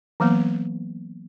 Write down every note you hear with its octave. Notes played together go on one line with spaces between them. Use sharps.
E3 F#3 A#3 B3